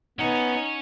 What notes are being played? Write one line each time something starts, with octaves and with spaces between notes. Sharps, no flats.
B3 C#4 D#4 C#5 F#5 G#5